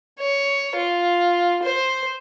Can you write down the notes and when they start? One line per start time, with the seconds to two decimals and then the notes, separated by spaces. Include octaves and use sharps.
0.19 C#5
0.76 F4
1.63 C5